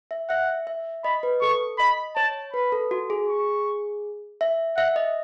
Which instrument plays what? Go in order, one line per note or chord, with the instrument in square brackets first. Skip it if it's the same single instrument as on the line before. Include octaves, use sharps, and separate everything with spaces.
[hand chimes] E5
[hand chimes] E5 [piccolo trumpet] F#5
[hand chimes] E5
[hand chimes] D#5 [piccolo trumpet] B5
[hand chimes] B4
[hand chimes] A4 [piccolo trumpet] C#6
[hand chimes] D#5 [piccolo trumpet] B5
[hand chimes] C#5 [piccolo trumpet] A5
[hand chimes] B4 [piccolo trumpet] B5
[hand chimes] A4
F#4
G#4
[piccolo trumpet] C#6
[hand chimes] E5
[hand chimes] E5 [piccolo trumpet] F#5
[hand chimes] D#5